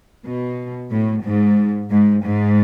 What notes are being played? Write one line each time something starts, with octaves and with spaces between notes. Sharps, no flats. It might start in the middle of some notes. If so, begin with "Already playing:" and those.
B2
A2
G#2
G#2
G#2